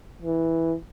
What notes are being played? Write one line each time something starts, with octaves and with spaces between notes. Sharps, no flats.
E3